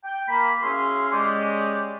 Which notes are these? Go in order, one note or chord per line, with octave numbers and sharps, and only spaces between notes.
G5
A#3 B5
C#4 E4 F#4 G#4 F5 C6
G#3 C#4 G4 D5